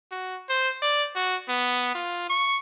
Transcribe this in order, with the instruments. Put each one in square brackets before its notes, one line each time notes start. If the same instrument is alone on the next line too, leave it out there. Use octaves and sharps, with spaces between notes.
[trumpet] F#4
C5
D5
F#4
B3
F4
C#6